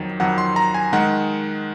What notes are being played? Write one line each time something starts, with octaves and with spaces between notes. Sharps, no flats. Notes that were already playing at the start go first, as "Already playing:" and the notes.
Already playing: F2 D#3 F#3
F2 D#3 F#3 F#5
C6
A#5
G#5
D#3 G#3 F#5